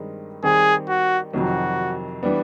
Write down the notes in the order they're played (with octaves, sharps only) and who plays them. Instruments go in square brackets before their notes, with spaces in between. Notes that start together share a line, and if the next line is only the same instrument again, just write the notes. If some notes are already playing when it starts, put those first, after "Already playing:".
Already playing: [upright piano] G2 D#3 G#3 C4 D#4
[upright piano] D#3 G3 C4 [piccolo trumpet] G#4
[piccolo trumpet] F#4
[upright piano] F2 C3 D#3 F#3 [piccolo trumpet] F#4
[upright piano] E3 G3 B3 D4